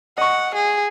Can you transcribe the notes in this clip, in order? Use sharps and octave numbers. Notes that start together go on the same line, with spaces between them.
D#5 F#5 C#6
G#4